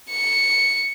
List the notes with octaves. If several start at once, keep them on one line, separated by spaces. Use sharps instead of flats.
C#7